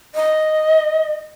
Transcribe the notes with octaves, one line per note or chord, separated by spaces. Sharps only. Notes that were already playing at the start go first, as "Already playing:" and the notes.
D#5